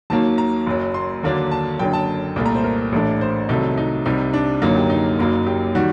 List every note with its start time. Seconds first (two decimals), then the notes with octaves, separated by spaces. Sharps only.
0.10 D#2 D#3 F#3 A#3 A5
0.38 A#5
0.66 F#1 F#2 F#3
0.94 C6
1.23 D#2 D3 F#3 A#3 D4
1.51 A5
1.79 F#1 F#2 D3 G5
1.93 A5
2.36 C2 A#2 A3
2.46 A#5
2.55 C5
2.64 A#4
2.92 A1 A2 A3 D4
3.21 C5
3.49 C2 C3 D#3 F#3 A3 D#4
3.77 D#4
4.06 C2 C3 G3 D#4
4.33 D4
4.62 F#1 F#2 D3 F#3 A#3 D#4
4.76 G4
4.90 D#4
5.19 F#1 F#2 F#3 A#3
5.47 G4
5.75 D#3 G3 F#4